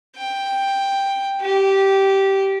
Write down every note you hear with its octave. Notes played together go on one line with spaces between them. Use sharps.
G5
G4